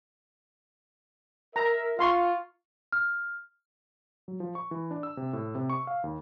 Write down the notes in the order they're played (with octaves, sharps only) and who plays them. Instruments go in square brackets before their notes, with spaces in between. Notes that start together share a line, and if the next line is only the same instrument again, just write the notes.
[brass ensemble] A#4 E5 [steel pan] A#5
[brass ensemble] F4 [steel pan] F5 C6 C#6
[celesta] F6
[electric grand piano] F#3
F3
C#6
E3
D4
E6
C3
A2
C3
C#6
F5
D#2